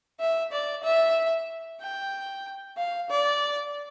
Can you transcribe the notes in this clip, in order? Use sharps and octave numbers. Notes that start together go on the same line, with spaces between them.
E5
D5
E5
G5
F5
D5